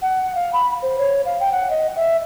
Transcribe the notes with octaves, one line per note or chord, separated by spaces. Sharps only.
F#5
F5
B5
C5
C#5
F5
G5
F#5
D#5
E5